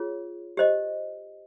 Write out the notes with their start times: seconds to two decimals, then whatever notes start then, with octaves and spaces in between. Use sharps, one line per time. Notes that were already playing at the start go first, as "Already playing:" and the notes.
Already playing: F4 G#4 C#5
0.57 G4 C5 D#5